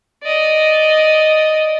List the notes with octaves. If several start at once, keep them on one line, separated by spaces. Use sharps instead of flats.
D5 D#5